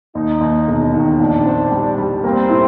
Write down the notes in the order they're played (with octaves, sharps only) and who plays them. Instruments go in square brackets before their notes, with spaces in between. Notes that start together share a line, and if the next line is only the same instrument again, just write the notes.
[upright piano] D#2 [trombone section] D#4
[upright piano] D#2
E1
D#3
[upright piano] A#1 [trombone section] D4
[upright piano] C4
G3
G3
[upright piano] A#3 [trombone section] C4
[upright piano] A2